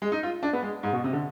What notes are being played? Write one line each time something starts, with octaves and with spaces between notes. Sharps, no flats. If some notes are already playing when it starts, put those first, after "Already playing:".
G#3
D#4
F4
D4
B3
G#3
G#2
B2
C3
D3